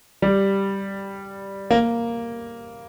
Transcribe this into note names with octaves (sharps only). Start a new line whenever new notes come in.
G3
A#3